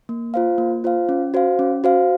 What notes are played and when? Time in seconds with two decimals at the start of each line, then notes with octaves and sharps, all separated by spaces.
0.09 A#3
0.34 F4 C5 F5
0.58 A#3
0.84 F4 C5 F5
1.09 C#4
1.34 F#4 C5 F5
1.59 C#4
1.84 F#4 C5 F5